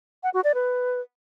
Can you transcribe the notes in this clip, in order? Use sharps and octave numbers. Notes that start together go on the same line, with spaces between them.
F#5
F#4
D5
B4